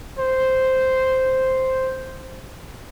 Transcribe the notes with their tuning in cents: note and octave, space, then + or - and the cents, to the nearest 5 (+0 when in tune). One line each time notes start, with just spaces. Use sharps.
C5 -5